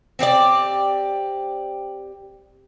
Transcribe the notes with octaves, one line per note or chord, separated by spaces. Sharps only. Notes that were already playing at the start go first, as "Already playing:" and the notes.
C4 G4 G#4 D5